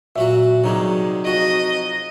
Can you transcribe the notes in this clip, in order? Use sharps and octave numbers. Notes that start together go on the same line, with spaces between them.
A#2 F#3 F#4 E5
C3 D#3 F#3 G3 D#4 G#4
F2 F#4 D#5